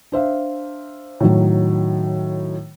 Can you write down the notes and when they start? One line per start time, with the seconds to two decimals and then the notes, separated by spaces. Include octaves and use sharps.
0.12 D4 C5 E5 F5
1.20 A2 D#3 F#3